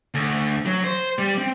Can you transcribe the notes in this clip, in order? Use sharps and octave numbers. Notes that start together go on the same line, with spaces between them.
D2
F#3
C5
G3
C4